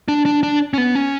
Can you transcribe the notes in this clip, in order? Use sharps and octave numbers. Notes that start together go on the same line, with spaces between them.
D4
D4
D4
C#4
B3
C#4